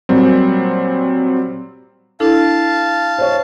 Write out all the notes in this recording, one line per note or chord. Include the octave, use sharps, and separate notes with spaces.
A#2 F#3 G3 C4
D4 E4 A4 F5 A5
C5 C#5